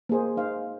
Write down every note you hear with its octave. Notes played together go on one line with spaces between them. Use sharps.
A#3 G#4 C5
D#4 C5 F5